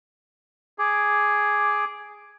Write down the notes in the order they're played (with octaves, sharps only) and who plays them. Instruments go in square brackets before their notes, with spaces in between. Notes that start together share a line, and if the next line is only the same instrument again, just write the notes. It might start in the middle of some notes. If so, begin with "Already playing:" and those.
[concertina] G#4 [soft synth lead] D6